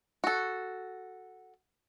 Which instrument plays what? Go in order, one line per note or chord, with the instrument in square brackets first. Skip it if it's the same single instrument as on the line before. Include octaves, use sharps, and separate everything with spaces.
[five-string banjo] F#4 A4